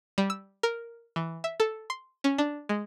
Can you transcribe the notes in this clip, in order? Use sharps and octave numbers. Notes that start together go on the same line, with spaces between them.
G3
E6
A#4
E3
E5
A4
C6
C#4
D4
G#3